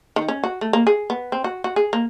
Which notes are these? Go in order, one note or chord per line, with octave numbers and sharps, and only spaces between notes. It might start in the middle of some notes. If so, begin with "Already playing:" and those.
D#3
C#4
F#4
A3
A#3
G#4
B3
C4
F#4
F#4
G#4
A#3